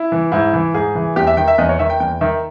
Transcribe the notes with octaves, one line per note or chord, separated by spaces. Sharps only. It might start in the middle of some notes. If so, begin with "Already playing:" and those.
Already playing: E4
E3
G#2 E4
E3
G#2 G#4
E3
E2 G4
E5
D#3 G5
E5
E2 D#5
C#5
D#3 E5
G5
E2 G5
D#3 E5